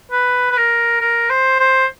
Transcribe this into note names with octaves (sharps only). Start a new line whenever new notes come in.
B4
B4
A#4
A#4
C5
C5